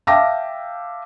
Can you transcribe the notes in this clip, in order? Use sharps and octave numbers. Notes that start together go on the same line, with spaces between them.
E5 F5 G5 A5 D6 A#6